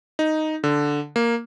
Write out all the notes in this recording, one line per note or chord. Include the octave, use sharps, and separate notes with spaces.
D#4
D3
A#3